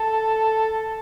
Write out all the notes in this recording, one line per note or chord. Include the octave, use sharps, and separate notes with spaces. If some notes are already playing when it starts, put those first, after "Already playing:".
Already playing: A4